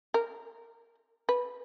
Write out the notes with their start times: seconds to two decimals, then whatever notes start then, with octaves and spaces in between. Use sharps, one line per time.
0.14 A#4
1.29 B4